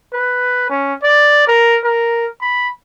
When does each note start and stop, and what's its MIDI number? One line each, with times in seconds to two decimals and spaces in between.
0.13 0.67 71
0.70 0.94 61
1.03 1.45 74
1.48 1.79 70
1.84 2.26 70
2.41 2.70 83